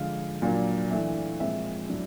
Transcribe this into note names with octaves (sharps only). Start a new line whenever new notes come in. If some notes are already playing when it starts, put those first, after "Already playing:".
Already playing: D3 F3 G#3 F5
A#2 F#3 A#3 D4
E3 A3 D4 E5
A#2 F3 G#3 C4 E5
A2 F#3 A3 D4